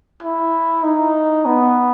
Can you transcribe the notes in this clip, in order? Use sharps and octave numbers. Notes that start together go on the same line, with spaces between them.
E4
D#4
B3